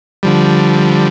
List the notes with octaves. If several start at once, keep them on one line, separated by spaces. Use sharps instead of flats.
D3 F3 G3